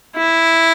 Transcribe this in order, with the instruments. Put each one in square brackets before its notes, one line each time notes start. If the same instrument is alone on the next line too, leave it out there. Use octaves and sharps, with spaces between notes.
[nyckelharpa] E4